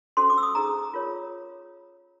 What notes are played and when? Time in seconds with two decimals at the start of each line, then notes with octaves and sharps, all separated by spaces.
0.17 C#4 F#4 A4 C5 C6
0.30 D6
0.38 E6
0.43 D#6
0.55 D#4 G#4 C5 A#5
0.94 F4 A#4 C#5